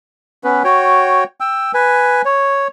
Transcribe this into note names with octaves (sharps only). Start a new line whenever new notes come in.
B3 C#4 B4
F#4 C#5 G5
G5 E6
B4 G#5
C#5